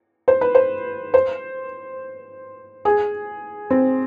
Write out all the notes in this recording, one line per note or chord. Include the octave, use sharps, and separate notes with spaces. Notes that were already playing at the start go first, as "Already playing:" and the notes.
C5
B4
C5
C5
G#4
C4